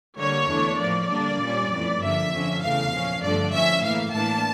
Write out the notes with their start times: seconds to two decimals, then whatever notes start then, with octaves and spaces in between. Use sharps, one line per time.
0.19 D3 G3 A#3 C#5
0.49 E2 E3 A3 D4
0.80 A2 F3 A#3 D5
1.10 D3 G3 A#3 D4
1.41 A#2 G3 C#4
1.71 F2 E3 A3
2.01 G2 D3 F3 A#3 E5
2.31 F2 D3 F3 C#4
2.62 E2 C#3 E3 A3 F5
2.92 A#2 F3 C#4
3.22 G2 D3 F3 A3 D4 D5
3.52 A2 F3 C#4 E5
3.83 A2 E3 A#3 F5
4.13 A2 E3 A#3 D4 A5